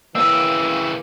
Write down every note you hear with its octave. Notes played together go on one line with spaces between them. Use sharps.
C#3 E3 A#3 C4 E6